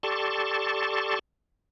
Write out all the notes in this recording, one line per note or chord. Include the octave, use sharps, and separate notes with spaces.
G4 A4 D5 A5 C6 C#6